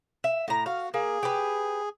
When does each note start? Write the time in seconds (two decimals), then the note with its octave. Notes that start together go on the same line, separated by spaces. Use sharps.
0.24 E5
0.48 A2 A#5
0.66 F#4 F5
0.94 A#3 G#4
1.23 G4 B4